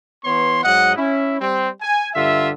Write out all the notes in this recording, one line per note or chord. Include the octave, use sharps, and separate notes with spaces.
E3 B3 C#5 C6
G#2 F#3 D#5 F#5
C#4 E4
G3 C4
G#5
G2 D3 F4 E5